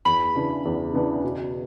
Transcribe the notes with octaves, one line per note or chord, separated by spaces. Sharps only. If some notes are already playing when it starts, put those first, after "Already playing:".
E2 B5
C#3 E3 B3 D4
E2
C#3 E3 B3 D4
B2